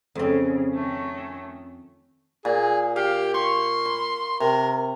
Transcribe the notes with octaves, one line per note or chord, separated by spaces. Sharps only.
F2 C#3 C4
D#3 A3 C#4
A#2 G#4
G4 F5
C6 C#6
B5
C3 A#4